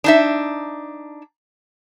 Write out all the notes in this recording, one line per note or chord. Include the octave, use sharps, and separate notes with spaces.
D4 D#4 E5